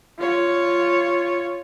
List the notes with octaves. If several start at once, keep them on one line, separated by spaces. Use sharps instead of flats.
F4 C#5